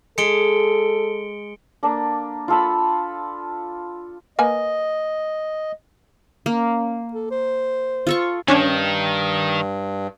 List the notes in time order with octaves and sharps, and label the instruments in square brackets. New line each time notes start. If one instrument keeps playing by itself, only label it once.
[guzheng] G#3 [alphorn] A4 [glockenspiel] C#7 D7 G7
[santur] A#3 D4 A4
F4 A4 B5
[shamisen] A#3 B4 G#5 [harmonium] D#5
[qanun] A#3 [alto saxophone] C#4
[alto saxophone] A4
C5
[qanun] F4 A4 C#6
[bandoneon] G2 [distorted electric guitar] D#3 [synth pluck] C#4 D4 C#5